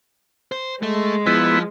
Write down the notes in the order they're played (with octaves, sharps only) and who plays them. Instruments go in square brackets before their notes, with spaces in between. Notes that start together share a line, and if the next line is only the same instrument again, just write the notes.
[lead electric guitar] C5
[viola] G#3 [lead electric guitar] A3
[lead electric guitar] F3 [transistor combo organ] B3 E4